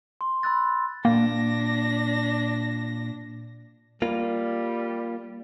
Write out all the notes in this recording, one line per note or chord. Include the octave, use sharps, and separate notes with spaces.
C6
B5 C6 E6 F#6 A6
A#2 A#3 D4 G5 A#6
G3 A#3 F4